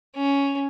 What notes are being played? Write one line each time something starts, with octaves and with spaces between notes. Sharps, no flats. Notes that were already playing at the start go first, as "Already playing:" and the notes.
C#4